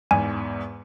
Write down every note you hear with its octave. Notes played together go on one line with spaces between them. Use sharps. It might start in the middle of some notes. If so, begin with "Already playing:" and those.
E2 G#2 G#5